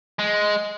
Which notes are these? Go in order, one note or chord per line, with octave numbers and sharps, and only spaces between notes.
G#3